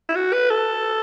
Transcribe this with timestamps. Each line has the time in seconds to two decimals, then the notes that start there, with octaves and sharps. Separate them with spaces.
0.09 E4
0.15 F#4
0.33 B4
0.50 A4